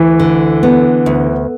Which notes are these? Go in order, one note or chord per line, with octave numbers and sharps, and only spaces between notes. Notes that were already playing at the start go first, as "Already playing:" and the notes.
Already playing: D2 E3
D3
B3
D2